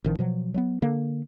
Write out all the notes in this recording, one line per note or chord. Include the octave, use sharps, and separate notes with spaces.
A1 D#3 F3
B2 F3 F#3
F#3 G#3 B3
D3 A#3